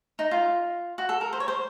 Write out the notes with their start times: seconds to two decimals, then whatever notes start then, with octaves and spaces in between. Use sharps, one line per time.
0.19 D#4
0.31 F4
0.98 F#4
1.09 A4
1.21 A#4
1.33 C5
1.40 C#5
1.48 C5